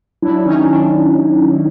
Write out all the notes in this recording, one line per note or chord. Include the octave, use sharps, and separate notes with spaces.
F#3 D4 E4
D#3 C#4 D#4
D#3 D4